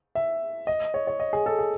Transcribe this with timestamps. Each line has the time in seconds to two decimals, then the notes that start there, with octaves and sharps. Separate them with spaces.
0.15 E5
0.67 D#5
0.94 C#5
1.07 C#5
1.20 D#5
1.33 G#4
1.46 A4
1.59 G#4